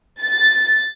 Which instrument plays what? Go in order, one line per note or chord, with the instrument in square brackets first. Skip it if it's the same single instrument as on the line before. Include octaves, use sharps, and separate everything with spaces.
[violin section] A6